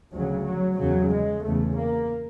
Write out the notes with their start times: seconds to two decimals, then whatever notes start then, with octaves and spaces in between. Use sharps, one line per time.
0.12 D2 C#3 F#3
0.45 F#3
0.79 E2 C#3 F#3
1.12 G#3
1.45 E2 C#3 A3
1.78 A#3